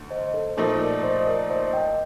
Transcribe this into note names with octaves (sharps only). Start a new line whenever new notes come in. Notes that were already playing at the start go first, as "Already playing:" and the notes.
Already playing: D2
C5 D#5
A4 C5
A#2 F3 A3 D#4 A4 C5
A#4 D5
C5 D#5
A#4 D5
C5 D#5
D#5 G5